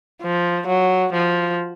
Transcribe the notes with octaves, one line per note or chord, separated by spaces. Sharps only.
F3
F#3
F3